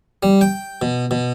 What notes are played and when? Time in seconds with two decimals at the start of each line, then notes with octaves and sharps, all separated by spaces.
0.23 G3
0.41 G5
0.82 B2
1.11 B2